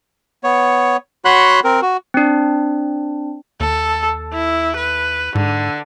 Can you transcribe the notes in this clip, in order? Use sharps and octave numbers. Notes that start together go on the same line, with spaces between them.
B3 C#5
F#4 C#5 F#5 B5 C6 F#6
C4 A#4
F#4
C4 D4
D#2 A4
E4
B4
G#2 D3